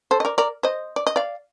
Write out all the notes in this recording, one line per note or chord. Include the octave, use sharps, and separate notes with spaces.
A4 C5
D#5
A#4 D5
A#4 D5
C5 D#5
D5
D#5
D5 F5